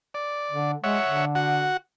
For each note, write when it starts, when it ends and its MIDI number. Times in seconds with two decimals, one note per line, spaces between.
0.14 0.71 74
0.52 0.74 50
0.84 0.98 56
0.84 1.25 73
0.84 1.25 76
0.84 1.25 78
1.06 1.70 50
1.35 1.77 66
1.35 1.77 78